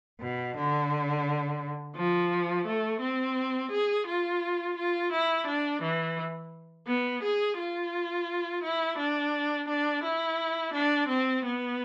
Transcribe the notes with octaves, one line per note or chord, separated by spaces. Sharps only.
B2
D3
F3
A3
C4
G#4
F4
F4
E4
D4
E3
B3
G#4
F4
E4
D4
D4
E4
D4
C4
B3